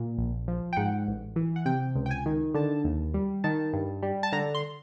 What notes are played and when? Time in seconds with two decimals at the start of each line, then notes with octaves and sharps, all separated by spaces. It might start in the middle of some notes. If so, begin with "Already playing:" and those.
Already playing: A#2
0.18 A#1
0.48 F3
0.73 G5
0.77 G#2 F#5
1.07 A1
1.36 E3
1.56 F#5
1.66 C3 G5
1.95 C#2
2.06 G5
2.11 G#5
2.26 D#3
2.54 D3 A5
2.84 D#2
3.14 G3
3.44 D#3 A5
3.73 G2
4.03 G3
4.23 A5
4.32 D3 A#5
4.55 C6